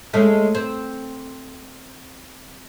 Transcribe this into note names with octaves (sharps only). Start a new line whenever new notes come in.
G#3 A3 C#4
C4